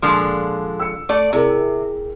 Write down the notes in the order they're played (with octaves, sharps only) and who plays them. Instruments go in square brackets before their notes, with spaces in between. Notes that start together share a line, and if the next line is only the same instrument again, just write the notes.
[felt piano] A#2 [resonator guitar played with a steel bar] D3 F3 G#3
[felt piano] E6 C#7
[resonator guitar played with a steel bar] A3 D5
[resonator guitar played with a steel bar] C3 [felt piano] E4 G#4 A#4